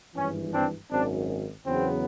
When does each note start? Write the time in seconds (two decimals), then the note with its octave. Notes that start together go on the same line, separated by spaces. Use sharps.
0.15 G#1 G2 E3 C#4
0.52 C4 D4
0.90 G#1 F#2 D#3 C4 D4
1.65 E2 C#3 F#3 B3 C4